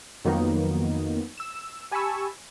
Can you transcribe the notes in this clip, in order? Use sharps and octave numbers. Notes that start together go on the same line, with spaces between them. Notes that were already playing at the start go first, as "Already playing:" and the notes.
F2 D#3 F#3 A#3 B3 D#4
E6 E7
G4 G#5 A5 B5 C#6 E6